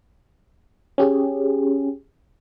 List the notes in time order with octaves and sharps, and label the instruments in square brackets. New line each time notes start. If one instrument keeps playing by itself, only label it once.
[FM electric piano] C#4 G4 G#4